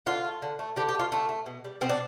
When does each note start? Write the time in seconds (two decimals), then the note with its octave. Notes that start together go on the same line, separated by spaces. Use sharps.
0.06 D3 F4
0.24 A3
0.42 D3
0.59 A3
0.76 D3 G4
0.89 G4
0.95 A3 F4
1.12 D3 A3
1.29 A3
1.46 B2
1.65 G3
1.81 B2 C4
1.89 D4